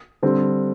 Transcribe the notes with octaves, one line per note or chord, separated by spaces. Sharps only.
D3 G3 C4